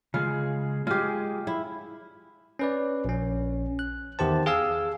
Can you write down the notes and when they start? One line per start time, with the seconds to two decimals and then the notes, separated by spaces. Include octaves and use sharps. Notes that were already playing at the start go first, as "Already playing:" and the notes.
0.14 C#3 G#3 F4 G#4
0.87 G#3 F4 G4 G#4
1.47 E4
2.59 C#4 B4 D5
3.05 A#1 C#4
3.79 F#6
4.19 E2 D#3 G4 C5 A5
4.46 G#4 F5 G#5 E6